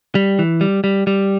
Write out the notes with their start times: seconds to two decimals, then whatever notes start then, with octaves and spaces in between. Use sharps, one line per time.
0.15 G3
0.39 E3
0.61 G3
0.84 G3
1.07 G3